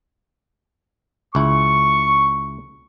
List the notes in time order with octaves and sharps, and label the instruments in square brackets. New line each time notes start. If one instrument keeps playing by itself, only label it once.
[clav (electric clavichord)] C#2 E4 [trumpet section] C#6